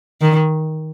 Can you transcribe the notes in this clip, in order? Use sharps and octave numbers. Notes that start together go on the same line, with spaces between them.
D#3